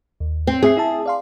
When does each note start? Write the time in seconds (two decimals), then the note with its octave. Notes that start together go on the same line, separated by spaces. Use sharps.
0.20 D#2
0.47 C4
0.63 C4 G#4 E5 C7
0.77 E4 E5 A5
1.06 D5 F5 C6